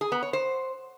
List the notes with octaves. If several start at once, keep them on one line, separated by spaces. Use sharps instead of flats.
G#4
B3
C#5
C5